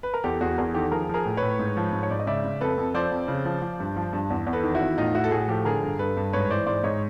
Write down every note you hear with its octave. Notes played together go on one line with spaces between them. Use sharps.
B4
A#4
E2 G4 A4
E2 F#4 G#4
E2 G#4 A#4
D#3 G4 A4
F3 G#4 A#4
F3 G#4 A#4
A2
B4 C#5
A2
G#2
F3
G#2
C#5
G#2 D5
D#5
C#3 D5 E5
C#3
F2 A4 B4
F2
F3 C5 D5
F2
C#3
F3
F3
G2
F3
G2
E2
E2
A4 B4
D#3
E4 F#4
E2
A2 D#4 F4
A2 E4 F#4
A4
A2 F#4 G#4
F3 G4 A4
D3 G#4 A#4
G2
G2 A4 B4
G2
G#2 B4 C#5
E3 C5 D5
G#2 C5 D5
G#2 C#5 D#5